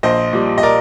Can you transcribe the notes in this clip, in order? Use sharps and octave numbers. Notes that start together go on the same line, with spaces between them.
A#1 C5 D#5
A#2 G3
D#5
A#4 D5